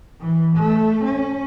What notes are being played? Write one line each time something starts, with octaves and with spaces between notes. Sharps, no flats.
E3
A3
C#4